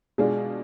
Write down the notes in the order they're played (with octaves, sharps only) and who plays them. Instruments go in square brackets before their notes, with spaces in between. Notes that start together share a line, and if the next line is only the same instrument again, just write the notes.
[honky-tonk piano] B2 G#3 D4 F4 [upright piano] G#4